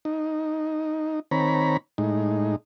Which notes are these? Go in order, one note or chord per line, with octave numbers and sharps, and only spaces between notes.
D#4
D#3 C4 C#5 A#5 B5
A2 G#3 D#4